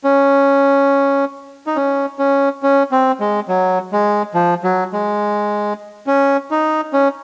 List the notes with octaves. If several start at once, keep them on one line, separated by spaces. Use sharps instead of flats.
C#4
D#4
C#4
C#4
C#4
C4
G#3
F#3
G#3
F3
F#3
G#3
C#4
D#4
C#4